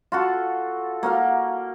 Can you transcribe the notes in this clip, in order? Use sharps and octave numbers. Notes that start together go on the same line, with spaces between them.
F4 F#4 A4
A#3 F#4 F5